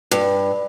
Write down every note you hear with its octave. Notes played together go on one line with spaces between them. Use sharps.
G2